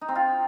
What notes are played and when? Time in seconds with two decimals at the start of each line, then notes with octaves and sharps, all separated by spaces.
0.01 D#4
0.08 C4
0.15 F4